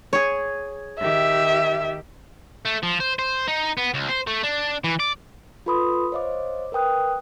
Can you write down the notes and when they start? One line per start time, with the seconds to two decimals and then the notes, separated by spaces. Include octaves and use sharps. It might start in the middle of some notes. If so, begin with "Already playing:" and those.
0.13 G#4 C#5
1.00 D#3 G4 E5
2.65 A3
2.83 F3
3.00 C5
3.19 C5
3.48 D#4
3.77 B3
3.94 C#2
4.09 C5
4.27 A3
4.43 D4
4.84 E3
5.00 D5
5.66 F4 A4 B4 B5 C6 D#6
6.12 C5 C#5 D#5 F5 D6
6.72 A#4 B4 G5 D#6 F#6